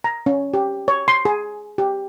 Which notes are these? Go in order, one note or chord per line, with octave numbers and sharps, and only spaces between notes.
A#5
C#4
G4
C#5
C6
G#4
G4